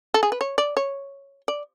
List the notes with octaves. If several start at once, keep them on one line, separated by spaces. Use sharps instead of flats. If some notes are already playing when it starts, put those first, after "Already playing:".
A4
G#4
B4
C#5
D5
C#5
D5